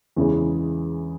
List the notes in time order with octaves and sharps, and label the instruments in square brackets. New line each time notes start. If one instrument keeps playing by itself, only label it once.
[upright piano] E2 C#3 E3 G#3